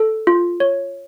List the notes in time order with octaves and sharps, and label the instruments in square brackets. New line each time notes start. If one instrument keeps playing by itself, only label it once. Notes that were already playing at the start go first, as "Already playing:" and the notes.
Already playing: [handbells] A4
F4
C#5